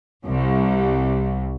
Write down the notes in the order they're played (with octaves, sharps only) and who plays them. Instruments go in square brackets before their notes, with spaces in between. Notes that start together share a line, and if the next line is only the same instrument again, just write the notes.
[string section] C2